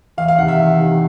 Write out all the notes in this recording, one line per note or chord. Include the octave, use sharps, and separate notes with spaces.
E2 F5
F5
C3 D#3 F#5
E5
E2
C3 D#3